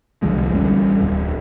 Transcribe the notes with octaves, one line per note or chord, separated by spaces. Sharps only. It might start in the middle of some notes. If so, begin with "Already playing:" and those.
C2 D3 F3 G#3
A1 E2 G3 C#4
D1